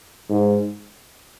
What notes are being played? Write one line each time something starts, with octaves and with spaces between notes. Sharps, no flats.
G#2